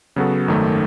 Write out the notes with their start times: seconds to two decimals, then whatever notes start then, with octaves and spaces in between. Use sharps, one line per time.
0.16 C#3 F#3 B3 F#4 A4
0.48 G#1 F#2 D#3 A3